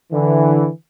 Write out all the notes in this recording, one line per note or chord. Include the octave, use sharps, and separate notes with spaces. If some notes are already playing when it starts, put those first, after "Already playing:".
D3 E3